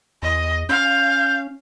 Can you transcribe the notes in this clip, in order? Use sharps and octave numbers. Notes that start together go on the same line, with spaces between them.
E2 D#5
C#4 F5 G6